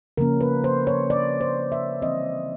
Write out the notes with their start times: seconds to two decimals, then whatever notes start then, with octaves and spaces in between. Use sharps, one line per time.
0.18 C#3 F3 A#3 C#4 A#4
0.41 B4
0.64 C5
0.87 C#5
1.10 D5
1.41 C5
1.72 E5
2.02 E3 G3 C4 D#5